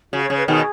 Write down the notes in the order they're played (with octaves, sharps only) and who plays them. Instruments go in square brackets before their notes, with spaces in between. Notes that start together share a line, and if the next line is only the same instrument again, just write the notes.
[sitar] C#3 [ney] F#4
[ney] C#5
[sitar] C#3
[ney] B4
[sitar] B2 D#3 [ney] G#4